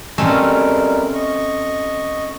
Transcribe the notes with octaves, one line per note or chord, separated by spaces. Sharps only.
B2 G3 A3 C4 C#4 A#4
D#5 C#6